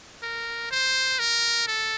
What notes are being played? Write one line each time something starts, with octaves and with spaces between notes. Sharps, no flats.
A#4
C5
A#4
A4